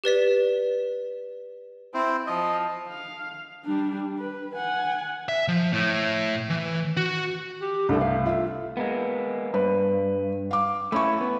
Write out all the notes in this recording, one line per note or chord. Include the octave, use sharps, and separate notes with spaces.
G4 B4 D5 B6
C4 E4 C5
F3 D#5
F5
G3 D4
B4
F#5 G#5
E5
F3
A2
E3
F#4
G4
C2 A3 D4 A4
F5
F4 E5
G#3 A#3 B3
G2 B4
F5 D6
A3 C#4 E4 B5 C#6
B3